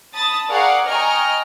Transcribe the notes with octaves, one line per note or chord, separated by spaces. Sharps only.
A5 B5 D#6 A6
G#4 A#4 D5 F5 F#5 C#6
D#5 G5 G#5 A#5 C#6 F6